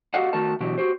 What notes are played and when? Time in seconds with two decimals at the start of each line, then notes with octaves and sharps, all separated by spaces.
0.14 F#4 G4 A4 D#5 F5 F#5
0.33 D#3 A3 F#4 A#4 A5
0.60 B2 D3 E3 F#3 E4 G4
0.78 F#4 G4 C5